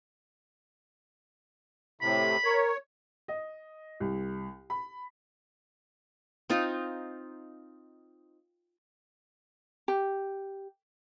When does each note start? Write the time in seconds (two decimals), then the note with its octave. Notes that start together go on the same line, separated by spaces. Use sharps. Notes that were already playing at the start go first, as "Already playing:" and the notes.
2.01 A2 C3 B5
2.44 A#4 C#5
3.28 D#5
4.00 C2
4.70 B5
6.50 C4 D#4 F4
9.88 G4